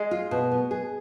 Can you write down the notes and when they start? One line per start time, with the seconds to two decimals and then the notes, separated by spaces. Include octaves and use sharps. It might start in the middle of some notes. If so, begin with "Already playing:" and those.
Already playing: G#3
0.11 F4
0.31 B2
0.52 B3
0.71 G#4